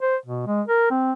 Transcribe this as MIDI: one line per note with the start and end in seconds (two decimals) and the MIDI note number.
0.01 0.16 72
0.26 0.46 47
0.47 0.62 56
0.68 0.89 70
0.91 1.13 60